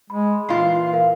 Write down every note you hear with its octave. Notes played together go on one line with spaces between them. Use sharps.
G#3 B5
A#2 E3 F4 C7
A#4 F5